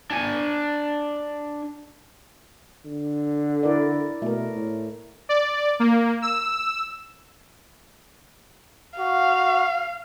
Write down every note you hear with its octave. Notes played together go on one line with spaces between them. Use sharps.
D4 G#5
D3
E4 A#4 D5
B2 A3 A#4
A2
D5
A#3
E6
F#4 F5